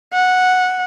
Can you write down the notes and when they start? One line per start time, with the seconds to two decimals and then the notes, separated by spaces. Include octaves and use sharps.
0.13 F#5